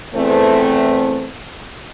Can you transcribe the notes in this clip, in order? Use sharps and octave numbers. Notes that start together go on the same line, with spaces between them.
E2 A3 C4